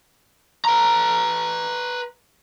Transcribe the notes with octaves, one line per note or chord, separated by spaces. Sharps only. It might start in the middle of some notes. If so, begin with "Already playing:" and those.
B4 A#5